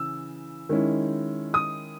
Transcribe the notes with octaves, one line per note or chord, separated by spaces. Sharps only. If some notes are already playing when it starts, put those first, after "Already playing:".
Already playing: C#3 E3 E6
D#3 G#3 C#4 E4
D#6